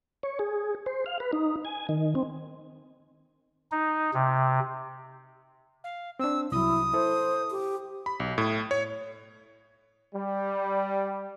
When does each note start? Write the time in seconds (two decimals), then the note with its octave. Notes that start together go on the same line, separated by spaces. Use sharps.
0.23 C#5
0.39 G#4
0.86 C5
1.06 F5
1.20 B4
1.33 D#4
1.65 G#5
1.89 D#3
2.15 C4
3.72 D#4
4.14 C3
5.84 F5
6.19 C4 D4 E6
6.52 C2 F#3 E4 D#6
6.93 E4 A4 C5
7.51 G4
8.06 B5
8.20 B1
8.38 A2
8.71 C#5
10.14 G3